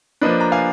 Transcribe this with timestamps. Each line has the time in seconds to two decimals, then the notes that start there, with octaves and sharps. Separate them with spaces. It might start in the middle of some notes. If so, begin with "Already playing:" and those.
0.22 F3 A#3 D4 B4 D#5
0.40 A#5
0.52 F5 G#5